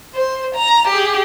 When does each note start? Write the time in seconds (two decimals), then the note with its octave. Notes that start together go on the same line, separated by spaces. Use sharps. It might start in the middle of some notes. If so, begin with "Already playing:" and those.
0.14 C5
0.55 A#5
0.88 G4 G#4